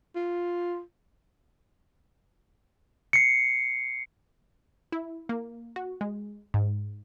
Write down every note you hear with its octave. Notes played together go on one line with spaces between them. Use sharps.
F4
C7 C#7
E4
A#3
F#4
G#3
G#2